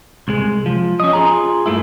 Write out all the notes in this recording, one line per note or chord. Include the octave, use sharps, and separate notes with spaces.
C2 G#3
F3
C#4 D#5
F4 G#4 A#5
G2 A3 A#3 E4